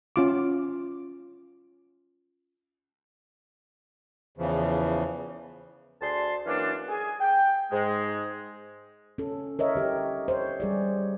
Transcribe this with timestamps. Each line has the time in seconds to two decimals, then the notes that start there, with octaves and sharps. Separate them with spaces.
0.16 C#4 F4 D6
4.38 E2 C#3 E3 F3
6.01 D2 G#4 D5 A5 C6
6.46 E3 F#3 A#3 C#4 D4
6.89 G#4 G#5
7.20 G5
7.71 G#2 G#3
9.18 C#4 A4
9.59 A#4 C#5 D#5 E5
9.75 D3 G4 C#5
10.28 C5 C#5
10.60 G3 G#4 D5